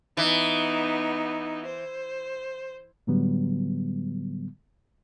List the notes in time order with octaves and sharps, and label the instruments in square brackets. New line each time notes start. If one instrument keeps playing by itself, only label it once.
[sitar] E3 [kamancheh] B3 D#4
[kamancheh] C5
[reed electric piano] A2 D3 F#3 G3 B3